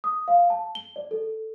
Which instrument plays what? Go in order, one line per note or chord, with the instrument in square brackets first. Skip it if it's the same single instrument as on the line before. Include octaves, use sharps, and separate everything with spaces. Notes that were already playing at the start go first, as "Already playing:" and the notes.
[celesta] D#6
F5
A5
G7
D5
A4